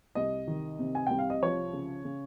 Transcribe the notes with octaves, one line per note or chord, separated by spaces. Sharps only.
C2 D#5
D#3
C3
G#5
C2 G5
F5
D#5
F3 C#5
C#3
C#3